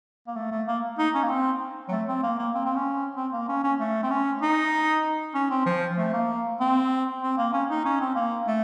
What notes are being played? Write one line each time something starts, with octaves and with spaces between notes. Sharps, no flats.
A#3
A3
A3
A#3
D#4
C#4
A#3
C4
F#3
A3
C4
A#3
A#3
C4
C4
C#4
C4
A#3
C#4
C#4
A3
C4
C#4
D#4
C#4
C4
F3
A3
A#3
C4
C4
A#3
C#4
D#4
C#4
C4
A#3
A3